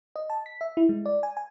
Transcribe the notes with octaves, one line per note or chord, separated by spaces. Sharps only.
D#5
A5
B6
E5
E4
G#3
D5
G#5
G#5